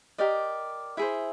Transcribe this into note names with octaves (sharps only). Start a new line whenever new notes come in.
G4 A#4 D5 D#5
E4 G#4 C5 E5